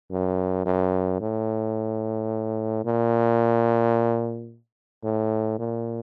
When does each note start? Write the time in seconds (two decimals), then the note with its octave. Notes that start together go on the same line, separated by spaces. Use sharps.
0.11 F#2
0.65 F#2
1.20 A2
2.85 A#2
5.04 A2
5.59 A#2